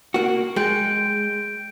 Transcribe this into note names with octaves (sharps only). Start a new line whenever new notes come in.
A#3 F#4
G#3 G5 G6 D7